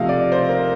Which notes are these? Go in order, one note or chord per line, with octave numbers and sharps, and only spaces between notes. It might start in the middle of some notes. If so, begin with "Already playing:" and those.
Already playing: C3 F3 A3 D#5 F5
D5
C5
A#4